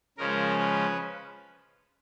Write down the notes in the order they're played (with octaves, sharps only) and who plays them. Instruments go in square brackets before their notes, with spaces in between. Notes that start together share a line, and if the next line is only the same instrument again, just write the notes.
[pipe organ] C#3 F3 G#3 C#4 A#4
B4